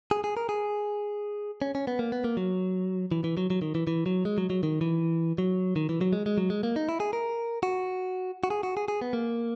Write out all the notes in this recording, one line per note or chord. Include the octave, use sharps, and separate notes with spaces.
G#4
G#4
A#4
G#4
C#4
C#4
B3
A#3
B3
A#3
F#3
E3
E3
F#3
F#3
D#3
E3
E3
F#3
G#3
F#3
F#3
D#3
E3
F#3
D#3
E3
F#3
G#3
G#3
F#3
G#3
A#3
D#4
E4
G#4
A#4
F#4
F#4
G#4
F#4
G#4
G#4
B3
A#3